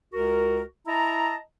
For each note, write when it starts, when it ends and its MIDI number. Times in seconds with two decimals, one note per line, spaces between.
0.13 0.61 37
0.13 0.61 66
0.13 0.61 70
0.87 1.35 64
0.87 1.35 75
0.87 1.35 81
0.87 1.35 82